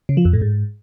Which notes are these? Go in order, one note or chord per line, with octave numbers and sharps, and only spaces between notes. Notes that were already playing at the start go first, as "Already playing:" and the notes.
C#3
F3
F2
A2
G#2